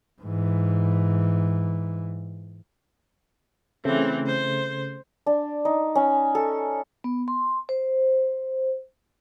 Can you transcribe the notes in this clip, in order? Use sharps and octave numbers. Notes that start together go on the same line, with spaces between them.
G#2 E3
C#3 E3 A3 C4
C5
D4
D#4
C#4
A4
B3
C6
C5